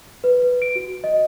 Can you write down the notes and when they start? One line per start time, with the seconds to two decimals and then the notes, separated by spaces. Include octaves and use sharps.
0.24 B4
0.42 B4
0.62 D7
0.75 F#4
1.04 D#5